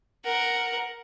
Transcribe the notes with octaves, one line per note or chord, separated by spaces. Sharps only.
A#4 F#5